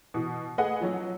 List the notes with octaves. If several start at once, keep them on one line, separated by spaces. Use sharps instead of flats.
B2 E3
A3 G#4 B4 D#5 F#5
F3 F#3 C#4